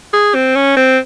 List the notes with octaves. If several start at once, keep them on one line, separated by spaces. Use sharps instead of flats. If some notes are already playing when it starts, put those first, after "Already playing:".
G#4
C4
C#4
C4